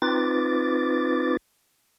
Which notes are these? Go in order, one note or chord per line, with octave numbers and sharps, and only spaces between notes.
C4 D#4 F4 B4 D6 A6